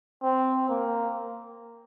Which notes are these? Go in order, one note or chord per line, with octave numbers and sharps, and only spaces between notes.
C4
A#3